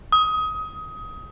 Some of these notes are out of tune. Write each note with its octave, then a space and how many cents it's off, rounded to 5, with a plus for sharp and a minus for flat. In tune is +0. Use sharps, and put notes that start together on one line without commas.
D#6 +20